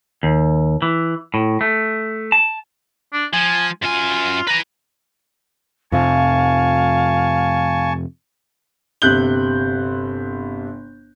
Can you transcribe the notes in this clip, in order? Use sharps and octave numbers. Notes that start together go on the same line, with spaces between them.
D#2
E3
A2
A3
A5
D4
F3 G#5
F#2 F4 G#5
B4 G#5 A#5
F2 C3 F3 F5 G#5 A5 C#6
G1 C3 F#6 G6 G7